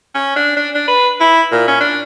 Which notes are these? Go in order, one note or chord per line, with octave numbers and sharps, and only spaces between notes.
C#4
D4
D4
D4
B4
E4
A#2
C#4
D4